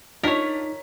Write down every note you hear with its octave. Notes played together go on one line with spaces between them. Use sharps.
D4 D#4 F4 A#4 C#5 B6